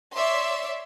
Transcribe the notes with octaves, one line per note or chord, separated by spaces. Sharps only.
C#5 D5 E5 C6